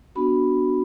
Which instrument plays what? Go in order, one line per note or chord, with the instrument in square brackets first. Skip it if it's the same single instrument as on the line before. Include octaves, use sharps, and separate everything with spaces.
[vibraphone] B3 D4 F#4 B5